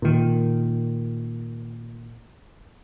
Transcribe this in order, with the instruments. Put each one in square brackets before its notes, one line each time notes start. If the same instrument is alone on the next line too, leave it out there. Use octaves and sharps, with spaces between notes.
[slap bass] A#2 D#3